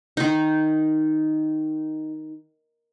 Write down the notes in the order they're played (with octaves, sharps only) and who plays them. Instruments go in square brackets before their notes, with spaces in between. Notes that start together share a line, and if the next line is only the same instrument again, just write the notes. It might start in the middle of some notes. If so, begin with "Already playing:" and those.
[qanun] D#3 D#4